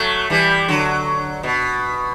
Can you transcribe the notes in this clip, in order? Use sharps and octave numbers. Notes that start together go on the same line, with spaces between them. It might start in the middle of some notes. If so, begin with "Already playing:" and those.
Already playing: F#3 A3
E3 G3
D3 F#3
B2